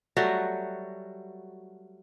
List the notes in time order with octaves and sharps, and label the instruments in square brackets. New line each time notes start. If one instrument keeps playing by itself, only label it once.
[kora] F#3 G3 A3 F#4